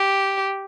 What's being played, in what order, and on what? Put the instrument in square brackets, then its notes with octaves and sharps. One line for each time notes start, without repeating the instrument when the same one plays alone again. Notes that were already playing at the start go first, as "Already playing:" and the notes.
Already playing: [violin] G4